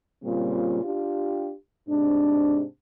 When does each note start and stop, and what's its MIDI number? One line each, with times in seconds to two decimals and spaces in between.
0.24 0.80 46
0.24 0.80 49
0.24 0.80 55
0.24 0.80 60
0.24 0.80 65
0.84 1.52 62
0.84 1.52 65
0.84 1.52 67
1.89 2.63 44
1.89 2.63 48
1.89 2.63 62